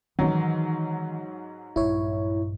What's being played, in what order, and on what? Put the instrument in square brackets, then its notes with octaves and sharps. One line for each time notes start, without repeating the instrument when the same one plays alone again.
[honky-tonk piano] G#2 F#3 [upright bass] D#3 E3
[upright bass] A#1 G2 [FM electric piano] E4 C#5